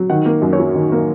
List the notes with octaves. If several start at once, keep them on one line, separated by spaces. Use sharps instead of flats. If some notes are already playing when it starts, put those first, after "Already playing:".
Already playing: F#3
D#3 F#5
A#3
F#2
C#5
F#3
D#3
A#3